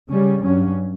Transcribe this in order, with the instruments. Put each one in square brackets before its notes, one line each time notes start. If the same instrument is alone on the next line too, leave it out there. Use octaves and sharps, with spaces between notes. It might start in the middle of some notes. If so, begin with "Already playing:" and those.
[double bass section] C#3 G3 C#4
G2 F#3 C#4